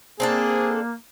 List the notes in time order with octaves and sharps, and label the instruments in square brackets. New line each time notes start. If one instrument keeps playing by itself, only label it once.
[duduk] A#3 [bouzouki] C4 D4 A4 [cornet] G#4